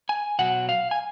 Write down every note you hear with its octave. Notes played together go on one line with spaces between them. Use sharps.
G#5
B2 F#3 F#5
F5
G#5